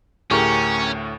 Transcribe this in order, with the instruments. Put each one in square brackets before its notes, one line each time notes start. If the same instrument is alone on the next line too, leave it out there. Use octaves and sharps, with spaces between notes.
[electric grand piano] D2 A2 C#6 [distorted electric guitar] C#4 [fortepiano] G4 G#4 A#4